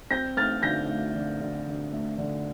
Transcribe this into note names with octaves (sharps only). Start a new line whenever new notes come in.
C4 G6 A#6
A3 F6 A6
D3 G6 A#6
A3
D3
D3
D3
A3
D3